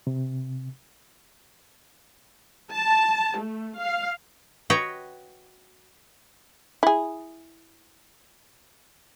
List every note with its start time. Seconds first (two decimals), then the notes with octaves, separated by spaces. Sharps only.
0.07 C3
2.71 A5
3.38 A3
3.78 F5
4.70 F#4 B4 C#5 D#5 G5
6.83 E4 G#4